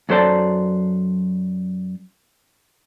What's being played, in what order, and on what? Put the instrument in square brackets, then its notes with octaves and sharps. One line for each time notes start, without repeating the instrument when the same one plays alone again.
[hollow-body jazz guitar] F#2 F#3 A4 C5 D5 A5